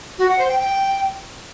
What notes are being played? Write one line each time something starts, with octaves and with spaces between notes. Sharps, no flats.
F#4
F#5
C5
G5
G5